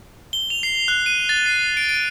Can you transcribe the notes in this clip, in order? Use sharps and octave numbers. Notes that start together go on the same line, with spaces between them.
G7
F7
C7
F#6
D#7
A6
C7
D7
D7